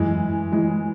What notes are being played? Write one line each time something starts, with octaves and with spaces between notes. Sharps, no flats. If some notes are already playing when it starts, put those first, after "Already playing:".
Already playing: F#2 E3 G#3
E3 G#3